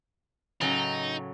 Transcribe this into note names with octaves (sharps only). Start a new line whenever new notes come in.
A2 C#3 F#3 D#4